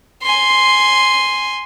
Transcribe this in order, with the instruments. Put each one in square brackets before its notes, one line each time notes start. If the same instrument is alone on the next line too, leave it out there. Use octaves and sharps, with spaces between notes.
[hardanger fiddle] G#5 C6